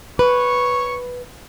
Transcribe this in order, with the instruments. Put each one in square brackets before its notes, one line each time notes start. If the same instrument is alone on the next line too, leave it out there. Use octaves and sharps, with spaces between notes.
[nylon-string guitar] B4 [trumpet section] C#5 C#6